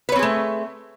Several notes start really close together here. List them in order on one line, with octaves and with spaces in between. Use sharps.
B4 C#5 C4 G#4 A3